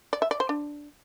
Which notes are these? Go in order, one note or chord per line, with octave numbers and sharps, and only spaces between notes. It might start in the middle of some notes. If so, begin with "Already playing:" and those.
D5
E5
D5
C5
D4